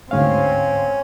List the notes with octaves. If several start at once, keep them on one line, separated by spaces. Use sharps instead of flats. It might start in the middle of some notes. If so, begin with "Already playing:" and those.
D2 G#2 C4 C#4 F5